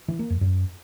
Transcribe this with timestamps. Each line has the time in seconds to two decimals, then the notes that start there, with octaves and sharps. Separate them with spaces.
0.08 E3
0.19 A#3
0.30 F2
0.41 F#2